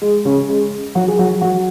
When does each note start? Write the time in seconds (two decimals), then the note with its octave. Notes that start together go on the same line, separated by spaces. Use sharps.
0.02 G#3
0.25 C#3 C#4
0.49 G#3
0.95 F#3 F#4
1.08 G#4
1.19 F#3 F#4
1.41 F#3 F#4